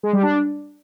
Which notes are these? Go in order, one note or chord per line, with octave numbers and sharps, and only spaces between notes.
G#3
G3
D4